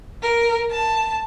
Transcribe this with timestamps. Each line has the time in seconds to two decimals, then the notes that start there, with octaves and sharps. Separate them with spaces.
0.23 A#4
0.71 A5